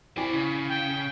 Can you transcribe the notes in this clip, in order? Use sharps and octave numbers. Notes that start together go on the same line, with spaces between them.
C4 E4 D5 G#5 B5
C#3
G5